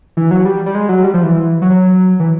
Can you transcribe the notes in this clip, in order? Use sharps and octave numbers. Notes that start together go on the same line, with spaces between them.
E3
F#3
G3
G3
G#3
F#3
G3
F3
E3
F#3
E3